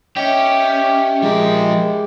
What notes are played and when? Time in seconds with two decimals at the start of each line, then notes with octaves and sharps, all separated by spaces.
0.16 C#4 G4 D#5 E5
1.22 F3 G#3 A#4